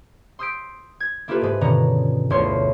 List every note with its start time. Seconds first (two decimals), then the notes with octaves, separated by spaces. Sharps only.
0.39 C6 D#6 E6 G6 B6 D7
1.00 G#6
1.28 A#3 E4 F4 G4 A4 B4
1.42 G#2 G#3 B4
1.61 G2 B2 D3 D#3 C#4 A#5
2.30 E1 D2 E4 F4 C#5 C6